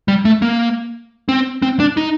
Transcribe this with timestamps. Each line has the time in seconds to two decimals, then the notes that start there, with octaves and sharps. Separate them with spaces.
0.08 G3
0.25 A3
0.42 A#3
1.29 C4
1.62 C4
1.80 D4
1.97 D#4